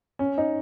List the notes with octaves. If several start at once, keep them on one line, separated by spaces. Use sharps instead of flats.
C#4
D#4